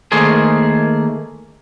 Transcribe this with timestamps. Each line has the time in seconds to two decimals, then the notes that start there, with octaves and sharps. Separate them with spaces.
0.12 D#3 A3 A#3 G#4 C5